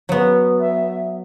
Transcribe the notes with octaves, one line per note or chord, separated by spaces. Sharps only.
F#3 B3
E5